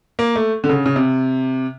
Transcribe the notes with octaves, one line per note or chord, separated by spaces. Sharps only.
A#3
A3
D3
C#3
C#3
C3